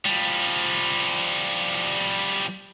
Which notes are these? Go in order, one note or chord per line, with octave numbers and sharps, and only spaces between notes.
F3 G3